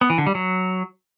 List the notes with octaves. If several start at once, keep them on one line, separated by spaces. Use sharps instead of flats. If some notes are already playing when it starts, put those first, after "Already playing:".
B3
E3
D3
G3
F#3